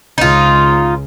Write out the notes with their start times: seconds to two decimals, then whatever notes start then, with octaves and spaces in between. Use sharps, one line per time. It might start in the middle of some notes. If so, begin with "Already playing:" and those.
0.18 C#2 C#3 D#4 F4